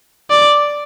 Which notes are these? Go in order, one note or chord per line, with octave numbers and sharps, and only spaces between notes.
D5